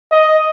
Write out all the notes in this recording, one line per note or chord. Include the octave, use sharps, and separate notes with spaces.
D#5